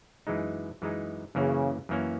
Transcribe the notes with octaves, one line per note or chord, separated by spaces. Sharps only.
F#2 E3 G#3 D#4
F#2 E3 G#3 D#4
F#2 C#3 E3 A#3 C#4
F#2 E3 A#3 C#4